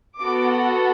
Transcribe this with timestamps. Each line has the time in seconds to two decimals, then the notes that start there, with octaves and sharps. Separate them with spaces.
0.19 B3 F#4 A4 D6
0.49 F#5